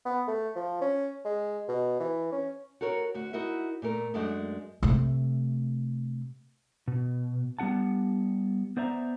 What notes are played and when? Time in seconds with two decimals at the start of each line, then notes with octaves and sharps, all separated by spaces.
0.06 B3
0.28 A3
0.56 F3
0.81 C#4
1.25 G#3
1.68 B2
2.00 E3
2.32 C#4
2.81 F#4 A4 A#4 C#5
3.14 D2 F#4
3.33 D#4 E4 F#4 A#4 E5
3.82 A#2 A3 A#4
4.14 F#2 G#3 A3 D4 F#4
4.83 C3 A3
6.88 B2
7.59 G3 B3 E4 F#5 A5
8.77 B3 C5 D5 E5 A#5